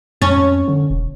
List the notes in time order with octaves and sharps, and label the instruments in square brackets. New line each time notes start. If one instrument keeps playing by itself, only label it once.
[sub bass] F2 [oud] C#4
[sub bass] D3
E1